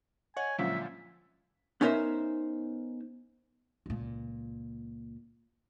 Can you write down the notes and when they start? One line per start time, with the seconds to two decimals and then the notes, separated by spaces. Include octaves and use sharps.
0.37 C#5 D#5 F#5 G#5 C#6
0.58 A#2 D3 F3 F#3 G#3 C#4 E5
1.81 B3 C#4 D#4 A#4 C5 E5
3.86 C#2 A#2